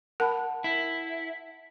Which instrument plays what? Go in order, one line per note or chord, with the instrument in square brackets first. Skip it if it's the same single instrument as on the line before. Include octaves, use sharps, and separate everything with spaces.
[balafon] A#4 [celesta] F#5 A5 B5
[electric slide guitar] E4